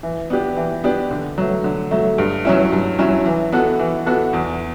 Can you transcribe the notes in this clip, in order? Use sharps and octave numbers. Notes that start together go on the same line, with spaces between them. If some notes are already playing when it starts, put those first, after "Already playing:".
E3
B3 D4 G4
E3
B3 D4 G4
D3
F#3 A3
D3
F#3 A3
G2
F#3 C#4 E4
G2
F#3 C#4 E4
E3
B3 F#4 A4
E3
B3 F#4 A4
E2